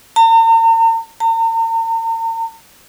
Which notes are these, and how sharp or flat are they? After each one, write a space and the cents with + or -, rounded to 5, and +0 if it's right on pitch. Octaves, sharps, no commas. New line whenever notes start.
A#5 -45
A#5 -45